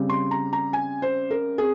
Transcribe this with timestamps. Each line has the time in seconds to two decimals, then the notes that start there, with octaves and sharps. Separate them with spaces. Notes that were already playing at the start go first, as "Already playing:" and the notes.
Already playing: C#3 G3 C4
0.09 C6
0.31 A#5
0.53 A#5
0.73 G#5
1.02 C5
1.31 A#4
1.58 C4 G#4